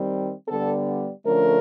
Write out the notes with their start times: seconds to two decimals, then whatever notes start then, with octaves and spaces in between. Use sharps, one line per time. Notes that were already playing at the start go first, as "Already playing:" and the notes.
Already playing: D#3 G3 C4
0.48 D3 G3 B3 A4
1.25 D3 F3 A3 C#4 A#4